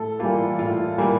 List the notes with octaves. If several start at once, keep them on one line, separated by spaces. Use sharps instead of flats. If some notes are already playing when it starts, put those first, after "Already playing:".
Already playing: A2 A4
E3 G3 A#3 F4
A2 F4
E3 G3 A#3